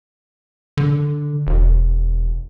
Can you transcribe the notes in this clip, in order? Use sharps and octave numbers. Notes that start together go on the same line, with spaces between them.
D3
E1